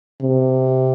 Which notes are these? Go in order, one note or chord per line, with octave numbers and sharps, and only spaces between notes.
C3